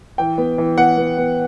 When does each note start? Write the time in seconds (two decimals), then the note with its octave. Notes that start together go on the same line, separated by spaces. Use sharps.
0.18 E3 G5
0.38 B3
0.58 E3
0.78 B3 F#5
0.98 B3
1.18 B3